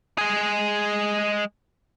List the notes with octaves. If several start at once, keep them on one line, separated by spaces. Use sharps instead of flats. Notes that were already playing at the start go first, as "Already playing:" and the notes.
G#3 G#4